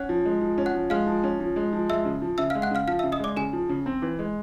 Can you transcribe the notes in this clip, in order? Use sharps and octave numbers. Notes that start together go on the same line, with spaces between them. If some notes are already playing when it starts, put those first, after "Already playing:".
Already playing: C#4 F#5 F#6
F3
G#3
F3
C#4
F#5 F#6
F3
G#3 F5 F6
F3
C#4
F3
G#3
F3
G#3 E5 E6
C#3
F3
C#3 E5 E6
G#3 F5 F6
F#5 F#6
C#3 F5 F6
F3 F5 F6
C#3 E5 E6
D#5 D#6
G#3 D5 D6
C#3 G#4 G#5
F3
C#3
C4
E3
G#3